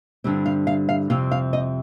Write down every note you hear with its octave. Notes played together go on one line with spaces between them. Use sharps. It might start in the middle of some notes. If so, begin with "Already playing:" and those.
G2 D3 G3 C4
F5
F5
F5
F2 C3 G3 C4 F5
F5
D#5